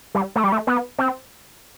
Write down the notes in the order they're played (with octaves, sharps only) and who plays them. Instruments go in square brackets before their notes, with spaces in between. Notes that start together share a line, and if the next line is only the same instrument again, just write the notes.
[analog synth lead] G3
A3
G3
A3
B3
C4